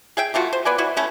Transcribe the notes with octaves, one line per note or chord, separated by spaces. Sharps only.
G#4 E5 G5
E3 A3 F4 F#4
C5
B3 B4 D5 G#5
E3 E4 F#4
A3 C#4 E4